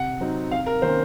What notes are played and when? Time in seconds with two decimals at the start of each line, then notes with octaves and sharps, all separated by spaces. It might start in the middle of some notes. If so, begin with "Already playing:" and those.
Already playing: C3 F#5
0.20 F#3 C4 D#4
0.51 C3 F5
0.66 A#4
0.82 D#3 A#3 C#4 C5